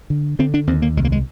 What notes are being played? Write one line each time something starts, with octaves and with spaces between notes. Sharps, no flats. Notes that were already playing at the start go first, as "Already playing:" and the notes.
D3
D3 C4
D4
D#2 C4
A#3
C2 G#3
A#3
G#3